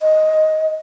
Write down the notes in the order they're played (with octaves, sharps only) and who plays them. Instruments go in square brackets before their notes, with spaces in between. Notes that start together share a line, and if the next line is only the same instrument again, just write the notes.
[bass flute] D#5